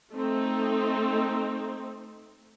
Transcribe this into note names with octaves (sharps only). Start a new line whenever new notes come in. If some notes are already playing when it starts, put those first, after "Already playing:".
A3 C4 D#4